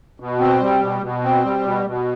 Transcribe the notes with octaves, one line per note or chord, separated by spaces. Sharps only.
B2
C4
G3
B2
B2
C4
G3
B2
B2